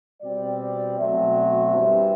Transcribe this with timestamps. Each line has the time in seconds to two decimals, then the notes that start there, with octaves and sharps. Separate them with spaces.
0.22 B2 G3 C4 D5
0.98 B2 F#3 A3 C4 E5
1.75 G2 E3 G3 C4